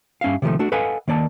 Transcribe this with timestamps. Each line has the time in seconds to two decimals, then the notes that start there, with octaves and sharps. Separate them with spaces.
0.21 G2 C#4 E5 F5
0.42 C3 D#3 F3 A3
0.59 A3 D4 F#4
0.72 A4 B4 D#5 F5 F#5 G#5
1.08 D#3 A#3 D5 A5